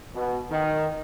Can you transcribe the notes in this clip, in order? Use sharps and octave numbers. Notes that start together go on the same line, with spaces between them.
B2
D#3